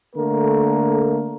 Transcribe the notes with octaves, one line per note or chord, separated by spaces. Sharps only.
D3 A3 A#3 A#4